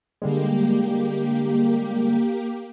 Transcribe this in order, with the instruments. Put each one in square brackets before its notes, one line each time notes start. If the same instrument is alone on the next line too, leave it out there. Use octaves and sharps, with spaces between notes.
[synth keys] D3 G3 G#3 [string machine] A#3 G4